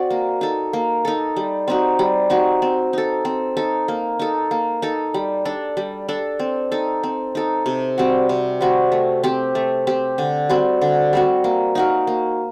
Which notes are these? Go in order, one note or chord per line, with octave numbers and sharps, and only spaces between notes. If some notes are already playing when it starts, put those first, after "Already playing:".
Already playing: C4 F#4 D5
A#3
D#4 A4
A#3
D#4 A4
G3
C4 D#4 F#4
G3
C4 D#4 F#4
C4
D#4 A4
C4
D#4 A4
A#3
D#4 A4
A#3
D#4 A4
G3
D4 A4
G3
D4 A4
C4
D#4 A4
C4
D#4 A4
C3
G3 C4 F#4
C3
G3 C4 F#4
A3
C4 G4
A3
C4 G4
D3
G3 C4 F#4
D3
G3 C4 F#4
A#3
D#4 F#4 A#4
A#3